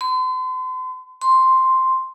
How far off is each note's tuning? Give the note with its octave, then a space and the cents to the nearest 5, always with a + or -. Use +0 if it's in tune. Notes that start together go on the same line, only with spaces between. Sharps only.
C6 -40
C6 +0